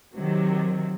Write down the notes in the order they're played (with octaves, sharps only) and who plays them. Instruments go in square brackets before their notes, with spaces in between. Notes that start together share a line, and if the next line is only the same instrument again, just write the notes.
[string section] C3 D#3 F#3